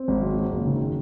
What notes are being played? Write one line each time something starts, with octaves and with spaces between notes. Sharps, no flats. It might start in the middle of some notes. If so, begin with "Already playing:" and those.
Already playing: C4
G#1
F#3
F#3
F#1
D#3